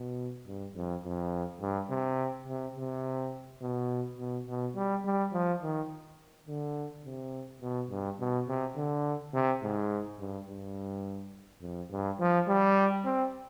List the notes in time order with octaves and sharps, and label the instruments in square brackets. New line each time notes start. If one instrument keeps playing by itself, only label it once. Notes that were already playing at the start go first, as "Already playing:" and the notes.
Already playing: [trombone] B2
G2
F2
F2
G2
C3
C3
C3
B2
B2
B2
G3
G3
F3
D#3
D3
C3
B2
G2
B2
C3
D3
C3
G#2
G2
G2
F2
G2
F3
G3
C4